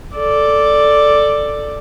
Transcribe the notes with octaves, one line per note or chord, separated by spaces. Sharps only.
A4 D5